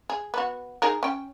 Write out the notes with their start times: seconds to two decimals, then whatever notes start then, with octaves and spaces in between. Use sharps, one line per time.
0.10 G#4
0.34 B3 F#4
0.82 D#4 G#4 A#4
1.03 C#4 G5